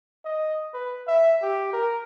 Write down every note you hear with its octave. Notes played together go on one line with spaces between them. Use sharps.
D#5
B4
E5
G4
A#4